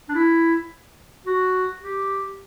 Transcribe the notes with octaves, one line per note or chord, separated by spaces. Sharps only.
D4
E4
F#4
G4